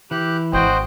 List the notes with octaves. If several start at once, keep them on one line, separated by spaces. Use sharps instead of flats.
E3 G4 F#6
G#1 F#4 C5 D#5 G5